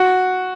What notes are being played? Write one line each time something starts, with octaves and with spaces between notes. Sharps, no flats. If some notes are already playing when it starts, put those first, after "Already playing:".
Already playing: F#4